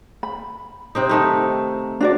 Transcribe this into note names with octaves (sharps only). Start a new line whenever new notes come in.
B5
C3 C4 D#4
D#3 A3 D#4
D4 F#4 D5